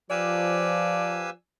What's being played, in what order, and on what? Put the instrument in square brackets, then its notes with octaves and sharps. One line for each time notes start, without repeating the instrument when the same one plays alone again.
[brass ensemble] F3 [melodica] G4 B4 F5 [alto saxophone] D5 [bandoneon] G#5 E6